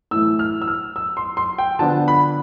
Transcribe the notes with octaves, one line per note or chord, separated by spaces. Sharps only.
A2 E3 A3 E6
F6
E6
F6
E6
C6
C6
G5
D3 F3 B3 D4 A5
B5